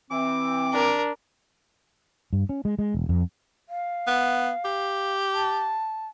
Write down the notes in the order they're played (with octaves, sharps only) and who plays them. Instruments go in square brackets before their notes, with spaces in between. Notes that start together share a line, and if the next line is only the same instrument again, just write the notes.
[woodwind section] E3 C4 [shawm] D6
[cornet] D4 [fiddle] A#4
[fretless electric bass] G2
C#4
G#3
G#3
E1
F2
[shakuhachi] F5
[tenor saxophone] B3
G4
[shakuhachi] A5